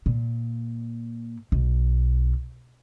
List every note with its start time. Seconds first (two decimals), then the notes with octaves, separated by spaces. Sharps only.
0.06 A#2
1.52 B1